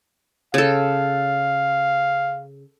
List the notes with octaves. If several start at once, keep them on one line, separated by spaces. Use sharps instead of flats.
C#3 A4 F5